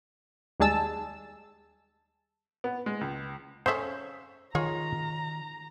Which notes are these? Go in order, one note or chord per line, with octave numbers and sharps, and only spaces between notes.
D#2 G3 G#3 G#4 A5 E6
B3
G#3
C#2
C#3 C#4 A4 C5 E5
D#3 F4 G#4 C#5 A#5